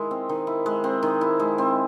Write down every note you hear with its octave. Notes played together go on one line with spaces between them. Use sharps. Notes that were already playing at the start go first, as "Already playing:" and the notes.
Already playing: D#3 G#3 E4
C4
D#3
E4
G#3
C4
D#3
E4
G#3
C4